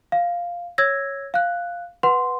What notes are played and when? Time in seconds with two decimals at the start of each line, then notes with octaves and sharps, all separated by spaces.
0.12 F5
0.78 C#5 E6 G#6 A#6
1.34 F5 F#6
2.03 B4 F#5 C6